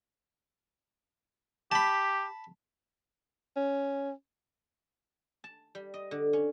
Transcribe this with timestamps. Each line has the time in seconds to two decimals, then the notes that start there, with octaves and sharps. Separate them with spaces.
1.72 G4 A5 B5
3.56 C#4
5.44 A5
5.75 G3
5.94 D#5
6.11 D3
6.33 C#4